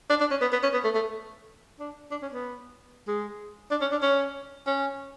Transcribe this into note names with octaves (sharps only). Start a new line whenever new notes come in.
D4
D4
C#4
B3
B3
C#4
B3
A3
A3
D4
D4
C#4
B3
G#3
D4
C#4
D4
C#4
C#4